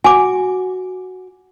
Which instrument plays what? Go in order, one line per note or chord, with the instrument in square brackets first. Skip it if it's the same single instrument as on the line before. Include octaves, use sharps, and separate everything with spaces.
[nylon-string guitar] F#4 [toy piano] G#5 D6